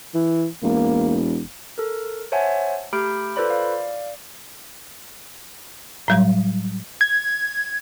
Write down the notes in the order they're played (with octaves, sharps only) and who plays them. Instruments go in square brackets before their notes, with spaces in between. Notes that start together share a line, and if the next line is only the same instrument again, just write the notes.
[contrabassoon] E3
[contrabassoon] E1 [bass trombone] A#3
[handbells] A4 A#4
C5 C#5 E5 F#5 G#5 A5
A3 G4 B5 F6 G6 D7
F4 A4 B4 C5 D5 B5
D5 F5
[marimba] A2 F#3 G3
[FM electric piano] G#6